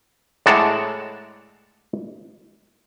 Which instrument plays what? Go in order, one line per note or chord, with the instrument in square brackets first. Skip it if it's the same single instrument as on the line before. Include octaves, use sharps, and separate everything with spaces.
[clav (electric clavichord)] A2 G#3 D5 F#5 A5 A#5